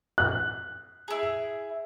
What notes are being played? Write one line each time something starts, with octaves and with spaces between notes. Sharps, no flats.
F#6
E4 G#4